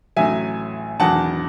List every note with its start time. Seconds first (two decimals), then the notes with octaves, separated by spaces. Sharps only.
0.16 A1 A2 F#3 E5 G#5
1.00 E1 E2 D#3 F#3 F#5 A5